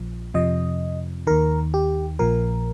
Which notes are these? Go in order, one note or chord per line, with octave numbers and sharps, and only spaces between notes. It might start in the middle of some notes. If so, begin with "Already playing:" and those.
Already playing: A#1 A#2 F3
F2 C3 F3 D#5
D#2 D#3 A#4
G4
A#1 A#2 F3 A#4